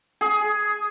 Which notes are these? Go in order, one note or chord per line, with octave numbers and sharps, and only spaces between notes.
G#4